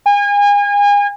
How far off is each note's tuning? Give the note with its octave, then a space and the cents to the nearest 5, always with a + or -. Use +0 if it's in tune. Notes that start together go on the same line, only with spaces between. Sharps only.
G#5 -35